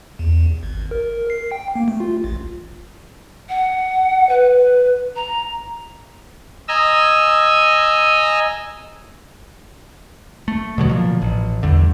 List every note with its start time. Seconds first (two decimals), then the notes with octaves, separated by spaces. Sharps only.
0.19 E2
0.63 G#1
0.91 A#4
1.30 C7
1.52 G5
1.75 A#3
1.88 A3
2.00 F4
2.24 A1
3.48 F#5
4.29 B4
5.15 A#5
6.68 D#5 G#5 A#5 E6
10.48 A3
10.78 B2 D3 F#3
10.90 A#2 F3
11.22 A1
11.63 E2 G2 D3